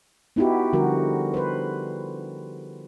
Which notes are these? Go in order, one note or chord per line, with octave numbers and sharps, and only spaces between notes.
B3 D#4 E4 F#4 G4
D3 F3 G3 F#4 A#4
B4 C5